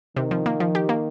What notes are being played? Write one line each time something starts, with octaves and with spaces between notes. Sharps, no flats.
C3 D#3
F3
A#3
F3
G4
A#3